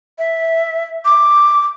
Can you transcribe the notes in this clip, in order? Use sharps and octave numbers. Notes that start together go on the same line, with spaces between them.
E5
D6